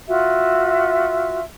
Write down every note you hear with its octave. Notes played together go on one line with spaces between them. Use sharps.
F4 F#4 E5